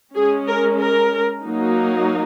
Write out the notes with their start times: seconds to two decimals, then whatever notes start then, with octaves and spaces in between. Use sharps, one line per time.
0.14 G#3 C#4 G#4
0.47 A#4
0.80 A#4
1.45 F#3 A#3 D#4